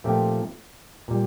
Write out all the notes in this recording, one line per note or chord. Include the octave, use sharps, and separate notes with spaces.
A#2 F3 A3 C4 G4
A#2 G3